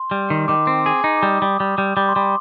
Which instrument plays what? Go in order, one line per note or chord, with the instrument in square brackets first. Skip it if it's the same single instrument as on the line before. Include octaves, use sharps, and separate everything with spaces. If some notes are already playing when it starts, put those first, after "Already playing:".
Already playing: [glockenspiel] C6
[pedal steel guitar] G3
D#3
[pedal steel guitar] D#3 [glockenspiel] D6
[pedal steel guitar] C4
G#4
D#4
[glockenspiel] D6
[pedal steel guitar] G3 [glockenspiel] D#6
[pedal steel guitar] G3
G3
G3
[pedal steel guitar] G3 [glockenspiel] D6
[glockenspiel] C6
[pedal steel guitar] G3
[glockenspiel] C6